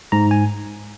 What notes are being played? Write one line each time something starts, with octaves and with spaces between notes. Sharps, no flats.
G#2 A#5
G#5